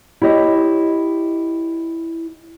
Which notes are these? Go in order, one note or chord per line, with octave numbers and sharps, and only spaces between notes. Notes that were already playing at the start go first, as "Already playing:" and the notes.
E4 G4 C#5 D#5